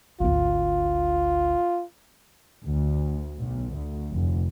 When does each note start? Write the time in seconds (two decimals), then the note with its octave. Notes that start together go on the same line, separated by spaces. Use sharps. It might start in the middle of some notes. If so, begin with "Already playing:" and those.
0.20 G#1 D2 F4
2.64 D2
3.38 B1
3.75 D2
4.13 F1